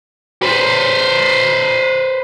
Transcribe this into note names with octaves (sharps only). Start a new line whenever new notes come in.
B4 C5